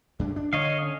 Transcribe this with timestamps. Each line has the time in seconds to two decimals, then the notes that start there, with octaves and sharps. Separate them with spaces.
0.19 F#2 D4
0.36 D4
0.53 D3 C#5 D#5 F5
0.82 C#4